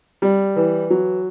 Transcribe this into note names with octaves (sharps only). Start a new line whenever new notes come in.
G3
E3
F#3